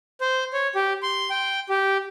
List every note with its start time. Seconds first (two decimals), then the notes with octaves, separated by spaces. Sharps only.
0.21 C5
0.53 C#5
0.75 G4
1.03 C6
1.30 G5
1.69 G4